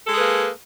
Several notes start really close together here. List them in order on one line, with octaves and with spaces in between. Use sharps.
A4 G#3 G#4 B4 A#3